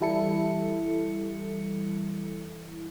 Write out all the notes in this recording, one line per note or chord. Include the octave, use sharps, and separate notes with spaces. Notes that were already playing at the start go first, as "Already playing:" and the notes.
E3 G3 E4 A4 C#7